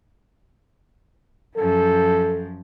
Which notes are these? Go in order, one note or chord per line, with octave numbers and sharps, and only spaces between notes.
F#2 F3 A4